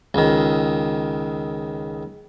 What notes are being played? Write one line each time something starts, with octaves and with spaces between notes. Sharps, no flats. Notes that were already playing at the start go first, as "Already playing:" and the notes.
C#2 D#3